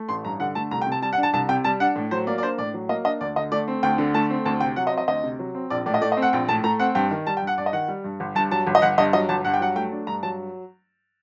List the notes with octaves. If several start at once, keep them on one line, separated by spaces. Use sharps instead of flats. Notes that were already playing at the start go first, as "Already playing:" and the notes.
Already playing: A3
A1 C6
G2 A#5
D3 F#5
A3 A5
C2 A#5
G5
C3
A5
G3 A5
F#5
D4
A5
C2 A5
C3 G5
G3 A5
D4 F#5
A2
F#3 C5
A#3 D5
D5
D4 C5
A2 D5
F#3
A#3 D#5
D4 D#5
D2 D5
D3 D#5
A3 D5
C4
D2 G5
D3
A3 A5
C4
D2 A5
C3 G5
F#3 F#5
D#5
C4
D#5
D2 D#5
C3
F#3
C4
A#1 D5
A2 D5
D#5
A3 D5
D#5
C4
F#5
A#1 G5
A2 A5
A3 A#5
C4 F#5
G2 G5
D#3
G3 A5
G5
G2
F#5
G2 D5
D#5
D#3 F#5
G3
G2
G1
G2 A5
F#3 A5
G1
D#5
G1 F#5
G2 D#5
F#3 D#5
G1 A5
G2 F#5
G5
F#3 F#5
A3 G5
D4
G2 A#5
F#3 A5